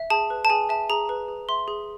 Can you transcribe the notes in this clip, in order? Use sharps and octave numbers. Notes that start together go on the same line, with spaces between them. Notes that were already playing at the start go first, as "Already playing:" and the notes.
Already playing: E5
G#4 A5
B4
A5
G#4 G#5
E5 A5
G#4 A#5
B4
G#4
E5 C6
G#4